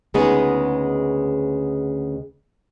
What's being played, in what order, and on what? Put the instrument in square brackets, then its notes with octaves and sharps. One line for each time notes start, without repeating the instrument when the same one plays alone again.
[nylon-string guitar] D2 C#3 G#3 B3 D#4 G#4